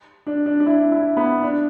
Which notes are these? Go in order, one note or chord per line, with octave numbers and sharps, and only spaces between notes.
D4
D4
D4
E4
E4
B3
D4